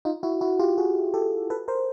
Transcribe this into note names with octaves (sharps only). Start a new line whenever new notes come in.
D#4 F4
E4 F#4
E4 F#4
F4 G4
F#4 G#4
G4 A4
A4 B4
A#4 C5